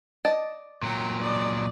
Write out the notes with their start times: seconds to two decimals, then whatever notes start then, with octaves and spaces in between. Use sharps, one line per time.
0.25 D5 D#5 A5
0.83 A#2 F#3 G5 A#5
1.20 D5 D#5